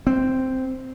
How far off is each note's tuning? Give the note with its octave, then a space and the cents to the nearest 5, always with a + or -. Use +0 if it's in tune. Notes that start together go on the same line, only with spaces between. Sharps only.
C4 -5